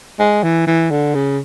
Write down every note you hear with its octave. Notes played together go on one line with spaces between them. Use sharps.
G#3
E3
E3
D3
C#3